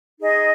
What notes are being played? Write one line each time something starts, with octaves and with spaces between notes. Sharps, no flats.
D#4 G#4 D#5